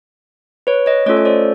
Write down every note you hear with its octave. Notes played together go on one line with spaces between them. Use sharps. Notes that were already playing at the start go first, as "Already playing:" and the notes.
B4 C#5
C#5 D#5
A3 C#4 F4 A4 C#5 D#5
C#5
C5 D5